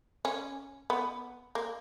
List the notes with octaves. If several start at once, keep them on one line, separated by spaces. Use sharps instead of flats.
C#4
B3
A#3